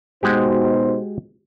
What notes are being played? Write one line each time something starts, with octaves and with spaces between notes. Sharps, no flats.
B2 G#3 D#4 F#4 G4 C5